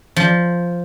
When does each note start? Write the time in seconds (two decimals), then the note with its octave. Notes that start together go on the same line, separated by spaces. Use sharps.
0.16 F3